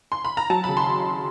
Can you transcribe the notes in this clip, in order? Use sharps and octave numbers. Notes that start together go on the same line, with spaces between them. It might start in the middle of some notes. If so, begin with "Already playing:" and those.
C6
B5
A#5
F#3 A5
C#3 B5
C6